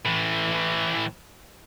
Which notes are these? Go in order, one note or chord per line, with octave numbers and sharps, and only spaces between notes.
A2 E3